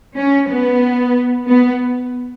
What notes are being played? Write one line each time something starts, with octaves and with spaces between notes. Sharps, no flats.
C#4
B3
B3